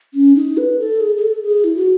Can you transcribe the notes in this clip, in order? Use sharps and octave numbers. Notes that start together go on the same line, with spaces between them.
C#4
D#4
B4
A4
G#4
G#4
A4
G#4
E4
F#4